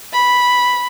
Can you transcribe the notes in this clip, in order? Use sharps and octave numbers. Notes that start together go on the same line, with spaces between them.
B5